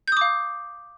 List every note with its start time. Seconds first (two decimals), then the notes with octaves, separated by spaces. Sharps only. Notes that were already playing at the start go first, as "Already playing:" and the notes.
0.08 G6
0.12 D#6
0.17 D6
0.21 F5